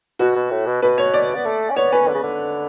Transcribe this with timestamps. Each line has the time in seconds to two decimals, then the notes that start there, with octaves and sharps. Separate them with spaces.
0.19 B2 F#4
0.36 B2
0.51 A2
0.67 B2
0.82 B2 B4
0.98 C#5
1.14 D5
1.35 B3
1.45 A3
1.70 C#4
1.76 B3 C#5
1.92 C#4 B4
2.08 D3
2.15 C#3
2.23 D3